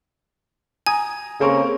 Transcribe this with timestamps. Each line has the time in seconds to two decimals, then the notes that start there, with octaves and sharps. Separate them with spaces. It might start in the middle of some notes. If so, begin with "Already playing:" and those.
0.86 G#5 A#5 D#6 G#6
1.41 C#3 A#3 C4 A4 A#4 C#6